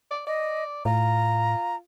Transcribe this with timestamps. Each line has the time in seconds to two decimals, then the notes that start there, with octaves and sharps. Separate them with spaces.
0.11 D5
0.27 D5 D#5
0.85 A2 F4 A#5